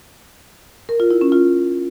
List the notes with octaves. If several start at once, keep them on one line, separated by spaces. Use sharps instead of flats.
A#4
F4
E4
C#4
F4